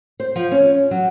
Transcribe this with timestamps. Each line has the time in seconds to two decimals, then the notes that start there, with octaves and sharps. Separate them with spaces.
0.20 C5
0.36 F3
0.52 C#4
0.91 F#3